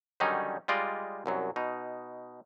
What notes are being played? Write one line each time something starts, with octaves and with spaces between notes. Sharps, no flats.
D3 D#3 F#3 G3 C#4 D#4
G3 G#3 F4 D5 D#5
C2 F#2 F#3
B2 D#4